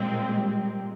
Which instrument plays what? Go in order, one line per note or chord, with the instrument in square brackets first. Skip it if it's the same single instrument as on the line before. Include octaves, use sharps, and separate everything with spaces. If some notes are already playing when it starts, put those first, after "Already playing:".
Already playing: [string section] A#2 G#3 C4 [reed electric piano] G3
[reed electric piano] G3